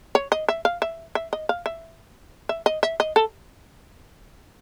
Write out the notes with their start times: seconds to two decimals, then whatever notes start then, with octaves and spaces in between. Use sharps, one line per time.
0.15 C#5
0.32 D#5
0.49 E5
0.65 F5
0.82 E5
1.15 E5
1.33 D#5
1.49 F5
1.66 E5
2.49 E5
2.66 D#5
2.83 E5
3.00 D#5
3.16 A4